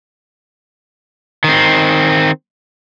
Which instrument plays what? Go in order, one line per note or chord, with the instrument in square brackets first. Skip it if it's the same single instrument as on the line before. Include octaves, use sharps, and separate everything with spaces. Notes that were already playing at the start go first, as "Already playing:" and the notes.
[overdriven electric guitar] D#3 C4